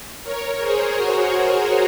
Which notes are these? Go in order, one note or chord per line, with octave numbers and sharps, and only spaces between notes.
A#4 C#5
G#4 C5
F#4 A#4
F#4 A#4